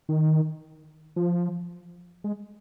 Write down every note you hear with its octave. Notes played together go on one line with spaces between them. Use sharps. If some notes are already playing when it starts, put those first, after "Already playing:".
D#3
F3
G#3